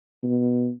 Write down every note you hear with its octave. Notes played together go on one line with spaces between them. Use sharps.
B2